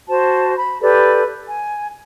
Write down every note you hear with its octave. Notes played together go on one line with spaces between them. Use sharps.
F#4 C5 A5
B5
G4 A4 B4 D5
G#5